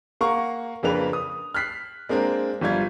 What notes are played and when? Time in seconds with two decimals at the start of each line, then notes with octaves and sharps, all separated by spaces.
0.21 A#3 F5 F#5 A#5 C#6
0.83 F2 C#3 A#3 D4 B4 F7
1.13 D#6
1.54 F6 F#6 B6 C7
2.09 G#3 A#3 C4 D4 A#4
2.61 G1 F3 G3 F4 G#6